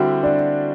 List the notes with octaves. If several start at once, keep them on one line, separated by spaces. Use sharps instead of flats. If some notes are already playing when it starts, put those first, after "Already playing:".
Already playing: D3 G3 C4 E4 F#4 G4
D4